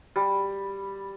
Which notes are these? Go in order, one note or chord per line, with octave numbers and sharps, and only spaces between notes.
G3